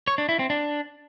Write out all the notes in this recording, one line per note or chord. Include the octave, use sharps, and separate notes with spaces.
C#5
D4
E4
C4
D4